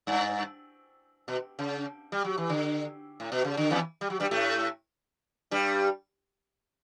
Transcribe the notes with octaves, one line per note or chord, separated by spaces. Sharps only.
G2
B2
C#3
G3
F#3
E3
D3
A2
B2
C#3
D3
E2 E3
G3
F#3
G2 G3
A2 A3
G2 G3